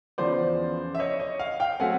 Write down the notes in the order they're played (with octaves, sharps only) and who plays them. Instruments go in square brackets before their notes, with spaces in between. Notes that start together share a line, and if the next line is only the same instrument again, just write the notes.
[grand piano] E2 C#3 F3 C5 D5
E5
C#5 D#5
C#5 D#5
D#5 F5
F5 G5
F#3 A3 C4 F#5 G#5